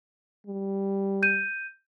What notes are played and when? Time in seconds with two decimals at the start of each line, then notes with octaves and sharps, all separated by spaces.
0.47 G3
1.22 G6 D#7